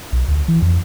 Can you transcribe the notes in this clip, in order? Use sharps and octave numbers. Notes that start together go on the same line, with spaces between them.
B1
D2
E3
F2